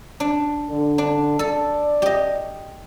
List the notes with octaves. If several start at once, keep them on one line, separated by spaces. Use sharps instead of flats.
D4
D3
D4
A4 D5
G4 D#5